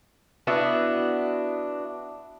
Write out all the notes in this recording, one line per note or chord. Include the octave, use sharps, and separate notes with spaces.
B3 D4 E4 F#4